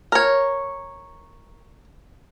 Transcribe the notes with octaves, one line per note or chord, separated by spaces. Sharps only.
A#4 C#5